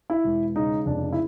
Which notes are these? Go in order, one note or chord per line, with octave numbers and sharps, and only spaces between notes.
E4
E1
C#3 D#4
F1 D4
E4